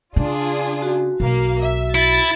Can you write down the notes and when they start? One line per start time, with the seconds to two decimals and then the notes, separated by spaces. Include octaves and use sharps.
0.16 C#3 D4 F4 G#4
0.82 F#4
1.20 B1 A#3 F5
1.59 E5
1.95 E4 A6